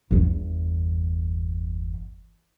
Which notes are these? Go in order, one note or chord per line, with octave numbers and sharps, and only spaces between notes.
G1 E2